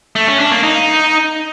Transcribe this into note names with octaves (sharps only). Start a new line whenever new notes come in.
A3
C#4
D4
A#3
D#4